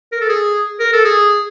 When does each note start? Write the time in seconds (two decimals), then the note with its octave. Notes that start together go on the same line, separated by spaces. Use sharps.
0.12 A#4
0.21 A4
0.29 G#4
0.80 A#4
0.93 A4
1.05 G#4